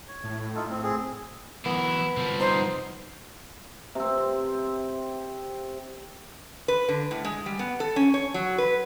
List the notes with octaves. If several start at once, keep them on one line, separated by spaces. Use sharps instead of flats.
C#5
A2
D#4 F4 A4
C4
C4 G#4
E3 F#3 B3 E4
C2 D3 F3 G3
D#4 C5
C3 C4
B4
D3
A2
G#3
G3
B3
A4
C#4
C#5
F#3
B4